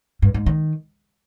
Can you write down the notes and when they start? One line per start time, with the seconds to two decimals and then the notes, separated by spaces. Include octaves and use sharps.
0.22 G2
0.34 G#2
0.46 D#3